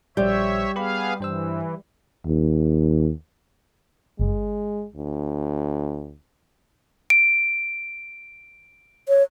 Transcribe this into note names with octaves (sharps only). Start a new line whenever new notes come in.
A#1 G3 C5 C#5 E5 G6
B3 G4 G#4 B4 F5 B5
G2 E3 C5 E6
D#2
G1 G#3
D2
D7
C#5